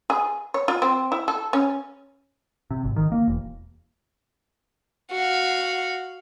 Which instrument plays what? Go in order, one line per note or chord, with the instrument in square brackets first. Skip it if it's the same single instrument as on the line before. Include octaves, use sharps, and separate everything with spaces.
[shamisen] G#4
C#5
F4
C4
E4
A4
C#4
[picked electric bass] C3
G#1
D#3
A#3
E1
[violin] F#4 F5